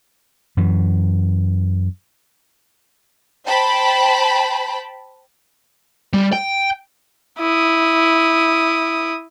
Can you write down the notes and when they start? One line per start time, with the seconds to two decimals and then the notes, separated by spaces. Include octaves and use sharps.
0.57 F#2 E3
3.46 C5 G5 A5 B5
6.14 G3
6.33 G5
7.39 E4 D#6